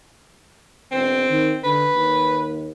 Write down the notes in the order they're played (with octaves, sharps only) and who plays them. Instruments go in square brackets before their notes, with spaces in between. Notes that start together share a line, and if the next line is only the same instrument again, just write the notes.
[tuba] E1 [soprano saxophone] C4
[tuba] D#3
[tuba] D3 [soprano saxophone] B4
[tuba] D#2